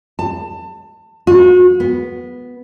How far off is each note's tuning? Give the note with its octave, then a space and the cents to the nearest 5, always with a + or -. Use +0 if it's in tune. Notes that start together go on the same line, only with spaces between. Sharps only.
A5 +25
F#4 -35
B3 +0